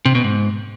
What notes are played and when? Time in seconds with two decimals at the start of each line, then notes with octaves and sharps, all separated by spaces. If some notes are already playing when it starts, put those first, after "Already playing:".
0.05 C3
0.15 B2
0.24 G#2